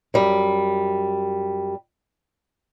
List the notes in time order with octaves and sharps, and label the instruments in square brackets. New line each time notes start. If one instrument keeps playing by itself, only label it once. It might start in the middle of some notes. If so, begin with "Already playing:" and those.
[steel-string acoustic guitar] F#2 G3